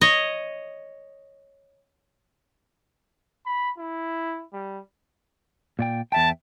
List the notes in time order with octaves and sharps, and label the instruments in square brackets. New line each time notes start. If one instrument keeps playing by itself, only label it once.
[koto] C#5 D#5
[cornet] B5
E4
G3
[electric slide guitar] A#2 D5 G5
[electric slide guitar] E2 E5 G5 [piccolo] A5